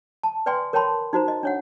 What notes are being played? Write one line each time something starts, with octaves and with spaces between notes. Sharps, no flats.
A5
B4 D5 G5 G#5 C6
A#4 C#5 G5 A5 B5 C6
D#4 F#4 C5 A#5
D#5
D4 C#5 F#5